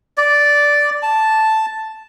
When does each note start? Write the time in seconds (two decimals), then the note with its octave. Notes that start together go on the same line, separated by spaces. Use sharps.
0.18 D5
1.03 A5